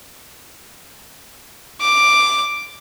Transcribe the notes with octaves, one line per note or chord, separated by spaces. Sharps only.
D6